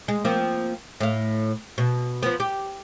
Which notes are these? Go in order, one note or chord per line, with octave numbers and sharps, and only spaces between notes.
G#3
F3 A#3 C4
A2 F5
B2
F3 B3
G4